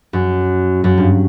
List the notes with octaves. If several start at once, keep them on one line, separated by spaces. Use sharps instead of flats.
F#2
F#2
G2